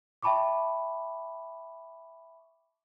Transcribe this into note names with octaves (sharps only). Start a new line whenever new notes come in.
E5 G5 A5 B5 C#6 D6